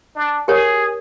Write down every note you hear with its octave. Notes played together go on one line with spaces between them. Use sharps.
D4
G4 G#4 A#4 C#5